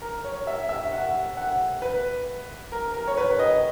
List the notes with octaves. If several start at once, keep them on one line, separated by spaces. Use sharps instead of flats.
A#4
C#5
E5
E5
F#5
F#5
B4
A#4
A#4
C#5
B4
D#5